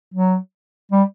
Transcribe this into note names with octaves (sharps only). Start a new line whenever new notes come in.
F#3
G3